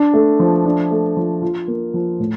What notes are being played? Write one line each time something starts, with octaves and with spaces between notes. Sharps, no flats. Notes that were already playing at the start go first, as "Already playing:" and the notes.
Already playing: D4
A3
F3
D4
A3
F3
F4
A#3
F3
A2